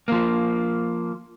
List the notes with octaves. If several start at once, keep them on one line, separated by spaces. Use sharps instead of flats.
F3 A#3